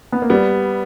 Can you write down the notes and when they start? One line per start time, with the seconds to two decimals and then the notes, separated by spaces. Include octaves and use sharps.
0.12 B3
0.22 A#3
0.30 G3 B3